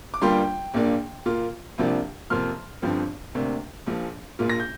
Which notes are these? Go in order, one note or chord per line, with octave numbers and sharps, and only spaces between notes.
D6
G1 G2 G3 A#3 F4 G5 C6
A#1 A#2 A#3 D4
A#2 A#3 F4
C2 C3 F3 A#3 D4
F2 C3 F3 A#3 C6 F6
G1 G2 D3 F3 C4
D2 C3 A#3 D4
A#1 A#2 F3
A#1 A#2 A#3 F4
A#6
G6